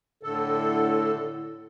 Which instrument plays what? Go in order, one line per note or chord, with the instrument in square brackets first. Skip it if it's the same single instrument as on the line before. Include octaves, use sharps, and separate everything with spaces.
[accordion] A2 D3 A4